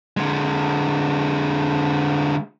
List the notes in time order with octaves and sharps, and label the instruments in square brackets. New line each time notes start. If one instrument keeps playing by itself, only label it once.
[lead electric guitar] D3 G#3